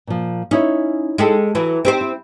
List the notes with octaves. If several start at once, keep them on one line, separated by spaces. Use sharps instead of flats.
A#2 F3
C#4 D#4 E4 C#5
G#3 G4 A4
E3 F#3
C4 D#4 G4 C5
E4